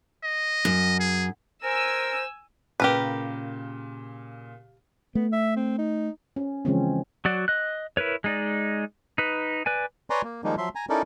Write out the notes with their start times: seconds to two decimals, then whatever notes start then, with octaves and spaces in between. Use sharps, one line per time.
0.23 D#5
0.65 F#2
1.00 G#4
1.63 A#4 C5 G#5 E6
2.80 A#2 C#3 G4 A#4 B4
5.15 A3 B3
5.32 E5
5.56 C4
5.78 D#4
6.36 C#4
6.65 C#3 E3 F3 G#3 C4 C#4
7.25 F#3 F#4 D5
7.48 D#5 F#6
7.97 E4 A#4 B4 C#5
8.24 G#3 D#4 D5
9.18 D#4 B4
9.66 B4 D5 G#5
10.10 B4 C#5 D5 G#5 A#5 C6
10.24 A#3
10.44 D#3 F3 G3 G#3 A#3 D#4
10.58 F3 F#3 E5 C6
10.75 G#5 A#5
10.89 C#4 D#4 E4 A4 A#4 D5